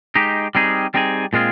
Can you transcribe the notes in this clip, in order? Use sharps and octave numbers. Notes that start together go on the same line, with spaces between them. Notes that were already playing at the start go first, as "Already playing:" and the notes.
G#3 D#4 G4
G3 C4 D#4 G#4
G3 C4 D#4 G#4
A#2 G#3 C4 F4 G#4